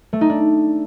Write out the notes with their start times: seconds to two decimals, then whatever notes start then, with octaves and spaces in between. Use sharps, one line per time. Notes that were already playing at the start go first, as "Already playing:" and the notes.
0.13 A3
0.21 D#4
0.30 D4